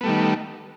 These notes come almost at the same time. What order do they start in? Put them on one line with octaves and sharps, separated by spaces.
B3 A3 G3 D#3